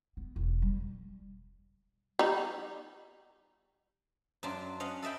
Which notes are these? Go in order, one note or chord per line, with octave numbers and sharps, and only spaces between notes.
B3
E1
G3
G3 D#4
F#2 F#3 D4 F4
C#4 D#5 F5 F#5
A4 D#5 E5 G5 B5